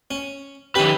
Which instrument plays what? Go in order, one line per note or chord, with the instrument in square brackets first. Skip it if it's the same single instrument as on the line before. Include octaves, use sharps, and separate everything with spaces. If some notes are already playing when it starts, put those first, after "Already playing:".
[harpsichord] C#4
[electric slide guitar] D#3 B4 [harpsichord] C#4 G4